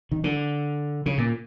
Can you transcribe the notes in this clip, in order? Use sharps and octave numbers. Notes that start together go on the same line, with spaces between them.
D#3
D3
C#3
A#2